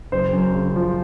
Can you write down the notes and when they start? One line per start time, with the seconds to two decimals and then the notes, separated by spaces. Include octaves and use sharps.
0.12 F#1 C5
0.33 F#2
0.54 C#3
0.76 F3